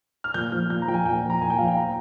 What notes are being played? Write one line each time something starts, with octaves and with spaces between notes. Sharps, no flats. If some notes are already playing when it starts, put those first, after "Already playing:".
F6
A#2 G6
F3 F6
A#2 G6
A#5
F3 G5
G#5
A#2 G5
F3
A#5
A#2 G#5
G5
F3 F5
G5
A#5